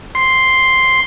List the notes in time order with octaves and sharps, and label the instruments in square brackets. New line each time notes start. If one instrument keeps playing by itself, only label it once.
[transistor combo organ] C6